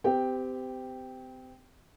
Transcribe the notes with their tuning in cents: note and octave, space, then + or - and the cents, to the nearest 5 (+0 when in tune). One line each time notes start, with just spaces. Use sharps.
C4 -35 G4 +0 G5 +0